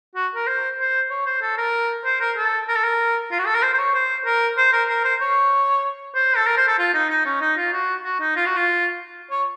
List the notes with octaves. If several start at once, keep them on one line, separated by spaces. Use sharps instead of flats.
F#4
A#4
C5
C5
C#5
C5
A4
A#4
C5
A#4
A4
A#4
A4
A#4
F4
F#4
A4
A#4
C5
C5
C#5
C5
A#4
C5
A#4
A#4
C5
C#5
C5
A4
A#4
C5
A4
F4
D#4
D#4
C#4
D#4
F4
F#4
F#4
D#4
F4
F#4
F4
C#5